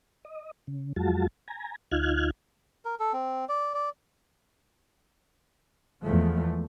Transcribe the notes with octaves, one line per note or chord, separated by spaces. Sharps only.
D#5
C#3
F2 F#3 G#3 F4 F#4 A5
G#5 A#5
D2 D#4 F4 F6 F#6 G#6
A#4
A4
C4
D5
D5
E2 F3 G#3 A3